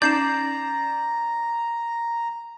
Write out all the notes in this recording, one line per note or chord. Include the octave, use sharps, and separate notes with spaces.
C#4 D#4 D5 A5 A#5 G6 C7 E7